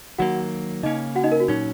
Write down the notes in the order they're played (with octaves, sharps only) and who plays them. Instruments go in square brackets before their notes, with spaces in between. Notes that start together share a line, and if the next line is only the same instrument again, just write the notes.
[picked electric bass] D#3 F#3 A#3 [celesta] F#4 F#5
[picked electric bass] C#3 A#3 C#4 [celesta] D#4 D#5
[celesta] F#4 F#5
D#4 D#5
A#4
F#4
[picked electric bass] A#2 F#3 C#4 [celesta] D#4